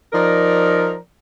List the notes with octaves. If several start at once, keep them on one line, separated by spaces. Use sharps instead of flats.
F3 D#4 A#4 D5